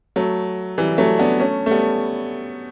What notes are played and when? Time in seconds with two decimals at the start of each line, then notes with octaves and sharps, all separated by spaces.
0.16 F#3 A3
0.78 E3 G3
0.98 F#3 A3
1.19 B3 D4
1.39 A3 C#4
1.66 A3
1.71 G3 B3